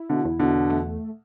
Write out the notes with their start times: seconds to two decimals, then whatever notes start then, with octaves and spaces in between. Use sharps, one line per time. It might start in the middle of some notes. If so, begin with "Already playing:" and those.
Already playing: E4
0.10 B2 D3
0.25 E2
0.40 B2 D3
0.70 A3